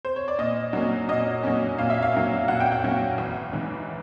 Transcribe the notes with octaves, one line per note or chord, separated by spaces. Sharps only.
C5
C#5
D5
A#2 D#5
F#3 A#3 C#4
A#2 D#5
F#3 A#3 C#4
A#2 F5
E5
F5
F#3 A#3 C#4
A#2 F#5
G5
F#5
F#3 A#3 C#4
A1
G#2 E3